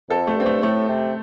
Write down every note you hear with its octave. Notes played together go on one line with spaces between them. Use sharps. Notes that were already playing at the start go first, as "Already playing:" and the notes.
F2 A4
A3
G2 C4
A3
A2 A3
C3